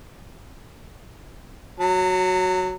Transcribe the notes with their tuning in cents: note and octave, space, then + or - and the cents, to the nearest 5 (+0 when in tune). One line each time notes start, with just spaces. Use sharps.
F#3 +0 A#5 -40